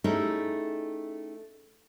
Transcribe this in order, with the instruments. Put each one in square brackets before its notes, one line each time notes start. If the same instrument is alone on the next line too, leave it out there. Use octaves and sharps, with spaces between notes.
[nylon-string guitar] A3 C#4 D#4 E4 G4 G#4